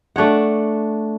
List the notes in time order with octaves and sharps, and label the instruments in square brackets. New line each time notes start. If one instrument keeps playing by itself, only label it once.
[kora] A3 D4 C#5 F#5